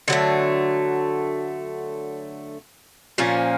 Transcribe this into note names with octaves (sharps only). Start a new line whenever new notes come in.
D3 F#3 A3
A#2 F3 A#3 C#4